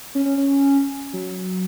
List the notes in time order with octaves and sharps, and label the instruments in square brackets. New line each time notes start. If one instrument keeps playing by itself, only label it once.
[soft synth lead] C#4
C#4
C#4
F#3